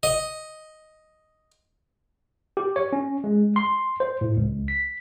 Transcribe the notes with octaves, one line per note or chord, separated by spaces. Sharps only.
D#5
G4
C#5
C#4
G#3
C6
C5
A2
C#2
B6